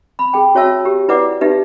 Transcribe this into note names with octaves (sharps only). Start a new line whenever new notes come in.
B5
G#4 G5
F#4 C#5 E5 A5 E6
G4
E4 B4 D5 F#5 D6
D#4 G4 B4 E5